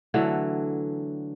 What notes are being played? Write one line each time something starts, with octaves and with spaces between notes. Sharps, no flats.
D3 E3 F#3 A3